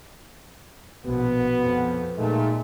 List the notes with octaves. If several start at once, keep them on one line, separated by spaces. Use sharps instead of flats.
A#1 B2 B3 F#4
F2
A#2 G#3 A3 D#4